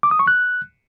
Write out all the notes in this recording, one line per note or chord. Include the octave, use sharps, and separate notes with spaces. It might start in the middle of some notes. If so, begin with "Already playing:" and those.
D6
D#6
C#6
F#6